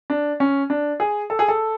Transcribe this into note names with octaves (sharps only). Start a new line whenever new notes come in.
D4
C#4
D4
G#4
A4
G#4
A4